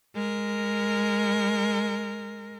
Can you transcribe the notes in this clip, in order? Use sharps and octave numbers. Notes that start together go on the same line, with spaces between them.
G#3 A#4